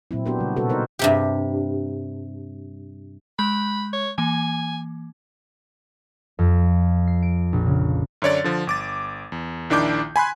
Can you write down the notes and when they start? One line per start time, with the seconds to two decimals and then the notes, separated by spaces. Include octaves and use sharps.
0.11 A#2 F#3 C4 E4
0.26 B3 D4 F#4 G4 A#4 C5
0.39 C#3 G3
0.56 B2 B3 F#4 A4 B4
0.69 D#4 A#4 C5
0.99 G2 C3 G4
3.39 G#3 B5 G6
3.93 C#5
4.18 E3 A#3 G#5
6.39 F2
7.07 C7
7.23 D7
7.53 A#1
7.66 C#3
8.22 F#2 D3 C#5 D5 A6
8.44 D3 F3
8.67 G1 D6 A6
9.32 E2
9.70 A#1 D#3 D4 E4 D6 G6
10.16 G#5 B5 C6 F#6